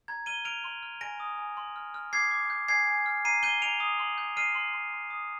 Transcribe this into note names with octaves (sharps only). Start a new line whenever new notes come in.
A#5 G#6
F6 D#7 G7
F6 D7 F7
C6
F6
G#5 A#6 D7
D#6
G#5
C6
F6
F6
D6 G#6 C7
D6
G6
G#5 G#6 C7
G#5
F6
A#5 C7 D#7
G6 D#7 G7
A#5 D7 F7
D#6
C6
G6
F6 C7 D#7
C6
C6
C6
D#6